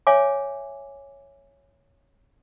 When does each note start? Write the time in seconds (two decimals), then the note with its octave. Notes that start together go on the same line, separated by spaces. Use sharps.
0.07 C#5 E5 G#5 D6